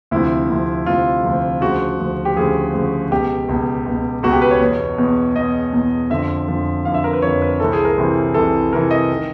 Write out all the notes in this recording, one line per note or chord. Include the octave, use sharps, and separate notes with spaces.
D2 C3 F3 E4
D2 C3 F3
D2 C3 F3 F4
D2 C3 F3
D2 C#3 F3 F#4
D2 C#3 F3
G4
D2 C#3 F3 G#4
D2 C#3 F3
C#2 B2 G4
C#2 B2
C#2 B2
C#2 B2 F#4
G4
B4
C#5
E2 B2
E2 B2
E2 B2 D#5
E2 B2
F2 D3 F3 E5
F2 D3 F3
F2 D3 F3 F5
E5
A#4
B4
F2 D3 F3 C#5
B4
C2 C3 E3 A4
G#4
A#4
C2 C3 E3
C2 C3 E3 A4
C2 C3 E3 A#4
D#5
D#3